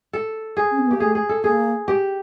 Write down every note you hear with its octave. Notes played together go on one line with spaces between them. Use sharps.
A4
G#4
C#4
C4
B3
A#3 G4
A3 G#4
G#4
A4
A#3 G#4
G4